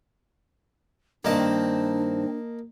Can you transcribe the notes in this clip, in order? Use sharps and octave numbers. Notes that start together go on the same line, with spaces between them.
G2 D#3 A#3 C4 D4 D#5 A5